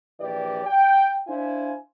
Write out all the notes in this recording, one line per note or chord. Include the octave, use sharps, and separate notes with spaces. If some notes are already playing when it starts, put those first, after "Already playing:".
A#1 E3 G4 D5
G5
D4 E4 C5 F5 G#5